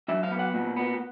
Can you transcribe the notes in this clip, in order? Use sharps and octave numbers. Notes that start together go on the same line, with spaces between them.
F#3 E5
F5
B3
F#5
A#2
B3